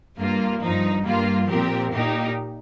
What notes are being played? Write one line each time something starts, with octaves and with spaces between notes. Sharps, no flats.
G2 G3 A#3 F4
G2 F3 D#4
G2 G3 A#3 F4
A#2 F3 C4 G4 A#4
A#2 A#3 D#4 G4